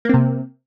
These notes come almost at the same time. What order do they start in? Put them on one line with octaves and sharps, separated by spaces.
A#3 C4 C3